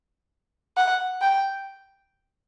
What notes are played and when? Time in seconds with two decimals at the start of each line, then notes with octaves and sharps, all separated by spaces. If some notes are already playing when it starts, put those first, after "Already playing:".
0.77 F#5
1.21 G5